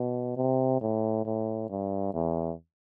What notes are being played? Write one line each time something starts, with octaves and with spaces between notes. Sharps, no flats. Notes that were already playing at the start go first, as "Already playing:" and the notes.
Already playing: B2
C3
A2
A2
G2
E2